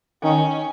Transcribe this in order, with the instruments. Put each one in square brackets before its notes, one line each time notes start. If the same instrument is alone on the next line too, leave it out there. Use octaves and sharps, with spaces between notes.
[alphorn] D#3 [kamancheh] C#4